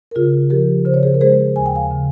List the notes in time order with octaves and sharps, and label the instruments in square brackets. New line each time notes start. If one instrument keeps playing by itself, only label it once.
[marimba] A#4
C#3 F4 G#4
F3 G4 A#4
C#3 C5
C#5
G#4 C5
A#4
G#3 G#4 C5
D#2 G#5
G5
F5 G#5
C#3